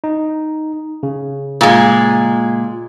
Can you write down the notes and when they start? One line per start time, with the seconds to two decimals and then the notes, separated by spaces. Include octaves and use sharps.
0.04 D#4
1.03 C#3
1.61 A#2 G#3